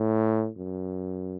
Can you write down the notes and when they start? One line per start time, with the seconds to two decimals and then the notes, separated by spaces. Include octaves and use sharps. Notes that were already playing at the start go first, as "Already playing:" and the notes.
Already playing: A2
0.57 F#2